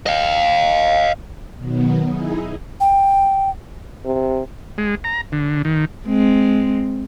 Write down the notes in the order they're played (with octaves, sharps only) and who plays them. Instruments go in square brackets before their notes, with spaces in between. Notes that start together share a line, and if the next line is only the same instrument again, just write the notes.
[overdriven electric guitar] D#5 F5
[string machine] B2 D#3 F#3 B3
D#4 E4 G#4
[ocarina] G5
[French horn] C3
[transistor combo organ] G#3
A#5
D3
D#3
[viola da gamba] G#3 C4